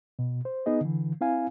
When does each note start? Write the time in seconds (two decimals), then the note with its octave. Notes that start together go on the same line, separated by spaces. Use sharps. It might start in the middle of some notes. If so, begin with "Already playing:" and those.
0.19 B2
0.45 C5
0.66 B3 D#4 G#4 D#5
0.81 D3 E3
1.21 C4 E4 F5 G#5